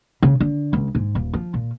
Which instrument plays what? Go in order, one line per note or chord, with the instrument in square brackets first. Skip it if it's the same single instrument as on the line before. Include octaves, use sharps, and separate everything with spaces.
[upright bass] C#3
D3
C#2
G#2
D#1
F3
A#2